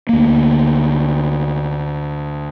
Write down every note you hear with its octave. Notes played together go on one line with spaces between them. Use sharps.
D2 A#3